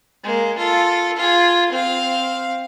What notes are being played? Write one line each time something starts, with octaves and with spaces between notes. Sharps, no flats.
G#3 A#3
F4 A4
F4 G#4
C4 F5